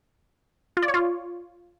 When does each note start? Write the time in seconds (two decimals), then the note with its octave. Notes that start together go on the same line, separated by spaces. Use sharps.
0.77 F4
0.82 D5
0.88 C#5
0.94 F4